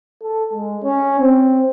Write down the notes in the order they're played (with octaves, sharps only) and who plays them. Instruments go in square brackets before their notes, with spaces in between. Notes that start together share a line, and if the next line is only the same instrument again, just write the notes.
[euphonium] A4
G#3
C#4
C4